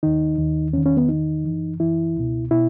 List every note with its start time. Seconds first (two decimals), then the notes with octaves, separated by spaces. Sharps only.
0.03 D#2 D#3 D#4
0.38 D#2 D#3
0.73 E2 C#4
0.78 D#3
0.86 C#4
0.97 B3
1.09 E2 D#3 D#4
1.45 F#2 E3
1.80 F#2 E3 E4
2.16 C#2 B2
2.51 B2 E4